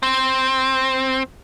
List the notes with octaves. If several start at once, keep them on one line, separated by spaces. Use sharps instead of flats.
C4